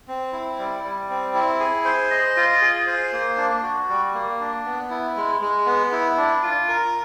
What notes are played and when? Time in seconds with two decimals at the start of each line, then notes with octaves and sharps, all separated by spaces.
0.08 C4
0.32 E4
0.58 G3
0.84 G3
1.09 C4
1.34 E4
1.60 G#4
1.85 C5
2.11 D#5
2.37 F4
2.62 G#4
2.87 C5
3.13 A#3
3.37 D4
3.63 F#4
3.89 G3
4.14 A#3
4.40 D4
4.65 B3
4.90 E4
5.16 G#3
5.41 G#3
5.66 B3
5.92 E4
6.17 D4
6.43 F4
6.69 A#4